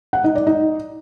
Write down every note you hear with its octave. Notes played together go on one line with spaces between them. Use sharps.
F#5
D#4
D5
D#4